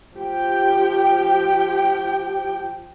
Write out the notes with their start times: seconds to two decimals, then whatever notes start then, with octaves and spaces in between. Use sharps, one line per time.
0.16 F3 G4 G5